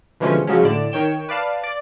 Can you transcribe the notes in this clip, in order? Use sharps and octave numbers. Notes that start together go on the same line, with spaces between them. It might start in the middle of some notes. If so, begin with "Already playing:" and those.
B2 D3 E3 F3 G#3 C#4
C#3 F3 F#3 G#3 C#4
A2 D3 D5 E7
D#3 C#5 G5 E7
B4 D5 F5 A5
D5